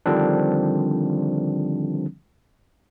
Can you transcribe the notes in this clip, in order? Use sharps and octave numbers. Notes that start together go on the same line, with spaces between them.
D3 D#3 F3 G3 C4 D4